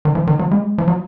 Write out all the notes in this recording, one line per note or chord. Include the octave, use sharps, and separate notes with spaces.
D#3
F3
D#3
F#3
G#3
F3
F#3